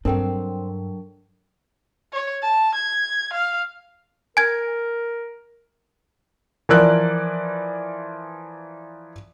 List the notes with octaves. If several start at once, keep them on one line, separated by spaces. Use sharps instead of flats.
G2 F#3 C4 D4 A4 A#4 G5
C#5
A5
G#6
F5
A#4 G#5 G#6
E3 F3 A#4 D5 F#6